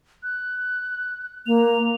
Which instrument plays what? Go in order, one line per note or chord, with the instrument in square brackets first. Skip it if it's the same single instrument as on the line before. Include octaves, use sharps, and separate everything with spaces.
[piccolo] F#6
[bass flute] A#3 [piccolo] F7